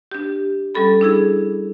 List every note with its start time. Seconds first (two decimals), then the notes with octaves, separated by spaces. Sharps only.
0.12 D4 G4
0.75 G3 C#4 A4 B5
1.01 D4 E4 G#4